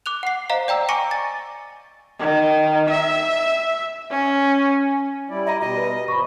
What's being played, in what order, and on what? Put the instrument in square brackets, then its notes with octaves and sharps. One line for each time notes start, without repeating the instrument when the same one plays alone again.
[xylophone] D6 F#6 F7
F#5 C7
C5 D#5 F5 A#5
D5 G5 A#5 E6
G#5 C#6 D6 A#6 C#7 D#7
A6
[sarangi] D#3
E5
C#4
[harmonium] G3 E4 D5
[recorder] D#5 [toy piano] E5 A#5
[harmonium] B2 G3 [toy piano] F#4 [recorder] D#5
[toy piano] B4 E5
[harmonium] F3 [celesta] B5 C#6